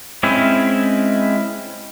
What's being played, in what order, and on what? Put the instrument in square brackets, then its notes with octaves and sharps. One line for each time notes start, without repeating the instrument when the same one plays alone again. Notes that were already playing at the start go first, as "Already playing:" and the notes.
[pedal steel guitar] G#3 C4 C#4 E4